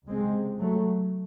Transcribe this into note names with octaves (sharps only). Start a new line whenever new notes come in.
C#2 C3 G#3 C4
F#3 A3